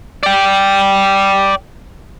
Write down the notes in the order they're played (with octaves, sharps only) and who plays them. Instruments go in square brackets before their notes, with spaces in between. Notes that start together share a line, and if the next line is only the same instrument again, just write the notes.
[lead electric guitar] D5 G5